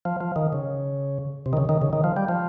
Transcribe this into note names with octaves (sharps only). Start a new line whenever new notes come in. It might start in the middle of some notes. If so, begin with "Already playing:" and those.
F3
F3
D#3
C#3
C3
D#3
C#3
D#3
C#3
D#3
F3
G3
F3